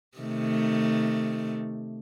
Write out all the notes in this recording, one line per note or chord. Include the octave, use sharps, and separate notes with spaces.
C3 D#3 A3